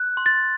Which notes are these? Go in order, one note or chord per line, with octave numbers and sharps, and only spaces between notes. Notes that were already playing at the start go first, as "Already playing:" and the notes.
Already playing: F#6
C6
A6